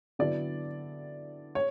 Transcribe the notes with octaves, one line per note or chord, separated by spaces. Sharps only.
D3 F#3 B3 E4 D5
C#5